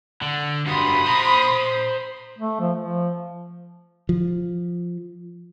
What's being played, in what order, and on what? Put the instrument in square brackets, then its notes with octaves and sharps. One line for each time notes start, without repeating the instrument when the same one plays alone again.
[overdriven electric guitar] D3
[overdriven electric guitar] G2 F#3 [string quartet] B5 C6 D#6
[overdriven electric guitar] C5 A#5
[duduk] A3
F3
F3
[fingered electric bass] F3